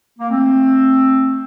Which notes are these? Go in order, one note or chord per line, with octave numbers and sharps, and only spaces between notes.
A#3
A3 C4